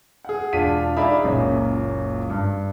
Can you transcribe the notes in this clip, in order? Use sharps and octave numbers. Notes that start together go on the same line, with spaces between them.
G#4 F#5
E1 D4 F4 B6 D#7
D#4 G#4 D5 E5 F5 B5
F#1 C#2 F#2 A#2 C#4
G2